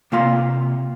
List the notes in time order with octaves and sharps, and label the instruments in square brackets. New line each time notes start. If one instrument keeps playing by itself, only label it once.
[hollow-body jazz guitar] C3 A#3 F4 F5 C6